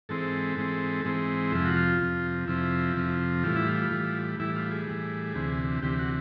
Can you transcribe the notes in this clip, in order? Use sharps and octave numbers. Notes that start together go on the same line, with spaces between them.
G#2 E3 G#3 C4 A4
G#2 E3 G#3 C4
G#2 E3 G#3 C4
F2 C3 F3 E4
F#4
F4
F2 C3 F3
F2 C3 F3 E4
F2 C3 F3
A2 E3 G3 F4
E4
F4
A2 E3 G3
A2 E3 G3 E4
F4
G#4
A2 E3 G3
D2 C3 E3
D2 C3 E3 G4
F#4